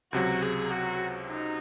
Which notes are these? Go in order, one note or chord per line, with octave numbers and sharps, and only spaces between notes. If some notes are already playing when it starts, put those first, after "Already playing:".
C#2 C3 F#3 F#4
G#4
F#4
D#4